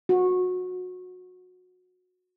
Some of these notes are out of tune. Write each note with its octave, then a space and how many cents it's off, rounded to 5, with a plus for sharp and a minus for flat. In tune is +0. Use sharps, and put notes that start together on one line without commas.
F#4 -25